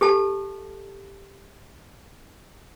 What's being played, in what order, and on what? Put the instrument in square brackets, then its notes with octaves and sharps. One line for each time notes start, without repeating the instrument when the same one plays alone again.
[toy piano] G4 A4 A5